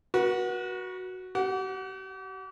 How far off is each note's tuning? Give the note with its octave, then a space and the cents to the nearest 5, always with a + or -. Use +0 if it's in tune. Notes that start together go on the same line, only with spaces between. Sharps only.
F#4 +0 B4 -45
G4 -40 F#5 +0